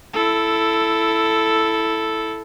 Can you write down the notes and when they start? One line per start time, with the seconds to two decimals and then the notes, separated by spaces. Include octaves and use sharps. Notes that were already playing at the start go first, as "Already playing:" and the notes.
0.13 E4 A4